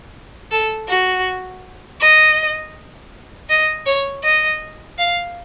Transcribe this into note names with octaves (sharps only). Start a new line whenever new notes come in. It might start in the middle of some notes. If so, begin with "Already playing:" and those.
A4
F#4
D#5
D#5
C#5
D#5
F5